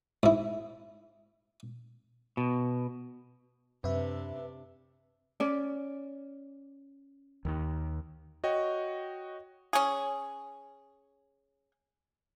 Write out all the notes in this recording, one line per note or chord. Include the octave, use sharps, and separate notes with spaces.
G#2 E4
B2
F#2 C3 D4 B4 E5
C#4 D5
D#2 D#3
F#4 C#5 D#5 G5
C#4 G#4